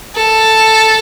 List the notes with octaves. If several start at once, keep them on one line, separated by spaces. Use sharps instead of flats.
A4